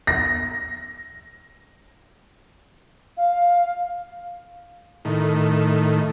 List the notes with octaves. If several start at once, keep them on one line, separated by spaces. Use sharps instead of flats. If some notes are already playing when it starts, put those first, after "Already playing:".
A#6
F5
A2 D#3